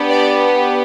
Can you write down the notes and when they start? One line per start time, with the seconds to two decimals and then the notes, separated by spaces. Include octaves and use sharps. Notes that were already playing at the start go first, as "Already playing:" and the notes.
Already playing: B3 D4 G4
0.09 D5